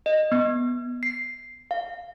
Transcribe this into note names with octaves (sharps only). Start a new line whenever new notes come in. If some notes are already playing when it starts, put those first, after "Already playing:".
D#5
B3
C7
F5